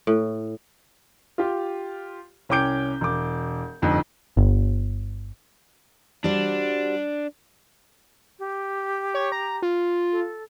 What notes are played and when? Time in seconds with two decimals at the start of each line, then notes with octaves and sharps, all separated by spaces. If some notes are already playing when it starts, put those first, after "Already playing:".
0.07 A2
1.38 F4 G4
2.49 C2 C#4 G5 D6 G6 D7
3.01 E1 D6
3.82 G1 F2 G#2
4.37 G1
6.24 G3 D4 F#4 C5
8.39 G4
9.14 C#5
9.32 A#5
9.62 F4
10.12 A4